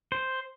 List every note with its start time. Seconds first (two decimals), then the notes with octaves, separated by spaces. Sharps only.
0.12 C5